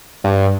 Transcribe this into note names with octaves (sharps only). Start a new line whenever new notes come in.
G2